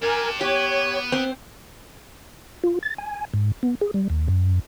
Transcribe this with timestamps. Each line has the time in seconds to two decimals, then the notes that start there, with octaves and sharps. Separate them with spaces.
0.02 D4 G4 A#4 G#5
0.41 B3 G4 C#5
1.12 C4
2.64 F4
2.83 A6
2.98 G#5
3.34 G#2
3.63 B3
3.81 G#4
3.94 G3
4.10 D#2
4.28 F#2